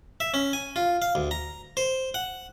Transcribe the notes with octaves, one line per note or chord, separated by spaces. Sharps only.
E5
C#4
G#5
F4
F5
D2
A#5
C5
F#5